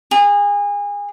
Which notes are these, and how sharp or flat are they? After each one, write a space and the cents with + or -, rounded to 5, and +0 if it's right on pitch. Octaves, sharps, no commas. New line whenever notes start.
G#4 -30